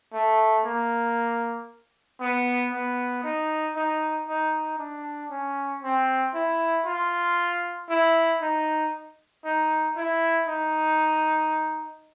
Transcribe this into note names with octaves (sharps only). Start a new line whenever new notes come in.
A3
A#3
B3
B3
D#4
D#4
D#4
D4
C#4
C4
E4
F4
E4
D#4
D#4
E4
D#4